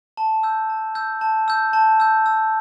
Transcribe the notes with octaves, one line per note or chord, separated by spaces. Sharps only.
A5
E6 G6
A5
E6 G6
A5
E6 G6
A5
E6 G6
E6